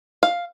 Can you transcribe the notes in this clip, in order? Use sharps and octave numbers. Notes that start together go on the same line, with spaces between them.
F5